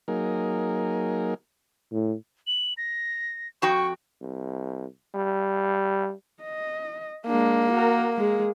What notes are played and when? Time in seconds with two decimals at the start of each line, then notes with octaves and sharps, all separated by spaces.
0.08 F#3 A#3 D#4 G#4 A#4
1.91 A2
2.47 F#7
2.77 A#6
3.62 F2 F#4 G5 C#6
4.21 C2
5.15 G3
6.43 D#5
7.26 G#3 A#3 D4
7.72 F#4 A#4
8.17 G#3 G#4